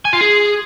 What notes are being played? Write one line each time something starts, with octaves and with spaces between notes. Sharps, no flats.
G#5
F4
G#4